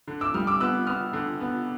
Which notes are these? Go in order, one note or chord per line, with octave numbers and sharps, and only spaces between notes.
D3
D6 E6
G3 D#6 F6
D6 E6
B3 E6 F#6
B3 D#6 F6
D3
B3